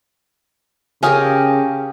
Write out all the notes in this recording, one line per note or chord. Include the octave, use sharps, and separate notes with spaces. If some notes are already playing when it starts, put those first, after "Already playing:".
C#3 C#4 G4 G#4 A#4 F5 D#6